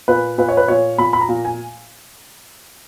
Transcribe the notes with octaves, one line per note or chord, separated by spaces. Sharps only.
A#2 B4
A#2 B4
C#5
B4
A#2 C#5
A#2 B5
B5
A#5
A#2
G#5